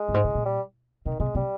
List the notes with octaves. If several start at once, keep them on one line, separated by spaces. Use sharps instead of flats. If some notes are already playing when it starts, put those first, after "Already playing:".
Already playing: G#3
G2
G#2
C#3
A#2
G3
C3 D#3
C3 G#3
C3 G3